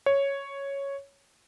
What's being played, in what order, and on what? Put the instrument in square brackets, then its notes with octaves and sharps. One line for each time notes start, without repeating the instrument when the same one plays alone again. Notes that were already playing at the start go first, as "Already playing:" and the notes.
[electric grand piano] C#5